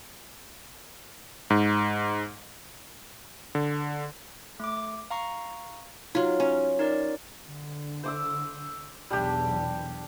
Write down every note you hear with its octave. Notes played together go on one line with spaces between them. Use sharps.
G#2
D3
A3 D6
F5 A#5 C#6
F#3 D#4 F4
C#4
D#4 A#4 D5
D3
C5 D6 E6
B1 E2 G3 D4 G4